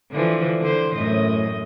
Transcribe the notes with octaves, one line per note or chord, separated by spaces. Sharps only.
D3 E3 F3
D3 C5
F#2 A2 D#5